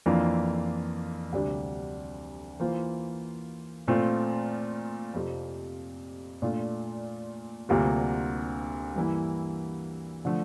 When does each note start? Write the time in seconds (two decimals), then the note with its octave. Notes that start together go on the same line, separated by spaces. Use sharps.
0.06 F2 E3 A#3 D4 F4
1.33 D2 C3 G3 D4 G4
2.60 E3 A#3 F4 C5
3.88 A#2 A3 C4 F4
5.14 F2 C3 F3
6.42 A#2 A3 D4 F4
7.69 D2 C3 G3 A#3 F4
8.95 G2 E3 A#3 E4
10.25 D3 F3 A3